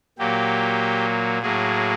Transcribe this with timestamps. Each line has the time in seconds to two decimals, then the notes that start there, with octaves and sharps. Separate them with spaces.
0.18 A#2 F#3 A#3 G4
1.42 A2 F#3 A#3 G#4